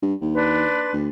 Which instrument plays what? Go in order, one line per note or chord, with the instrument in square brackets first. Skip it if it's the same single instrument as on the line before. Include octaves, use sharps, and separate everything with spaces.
[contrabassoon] G2
D#2
[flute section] D4 B4 C6
[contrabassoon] D2